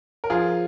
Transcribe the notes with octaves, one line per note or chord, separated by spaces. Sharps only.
A#4
F3 F4 G#4